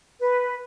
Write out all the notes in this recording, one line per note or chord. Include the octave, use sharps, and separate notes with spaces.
B4